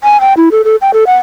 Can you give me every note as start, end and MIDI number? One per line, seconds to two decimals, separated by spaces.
0.03 0.20 80
0.21 0.33 79
0.37 0.49 64
0.52 0.62 69
0.65 0.76 69
0.81 0.91 79
0.94 1.04 69
1.07 1.16 78